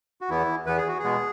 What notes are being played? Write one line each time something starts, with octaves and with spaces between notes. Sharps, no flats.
F#4
E2 E3 B3 E4
E2 E3 B3 B4
G#4
F#4
G#4
B2 G#3 B3